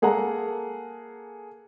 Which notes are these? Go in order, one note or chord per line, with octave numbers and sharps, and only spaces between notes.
A#3 G#4 A4 F#5 A#5